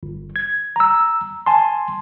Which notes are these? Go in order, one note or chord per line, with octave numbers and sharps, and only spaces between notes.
G1
G#6
A#5 E6
G#5 A5 C6